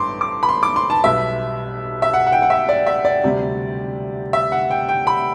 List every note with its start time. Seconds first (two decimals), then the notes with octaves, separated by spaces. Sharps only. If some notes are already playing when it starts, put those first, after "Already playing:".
Already playing: A1 G2 A3 C6 D6
0.21 D6
0.43 B5
0.49 C6
0.63 D6
0.76 C6
0.90 A5
1.03 B1 B2 G3 E5
2.02 E5
2.13 F#5
2.27 F#5
2.32 G5
2.42 F#5
2.50 E5
2.69 D5
2.87 E5
3.05 D5
3.23 D2 C3 G3
4.33 E5
4.52 F#5
4.71 G5
4.89 G5
5.07 B5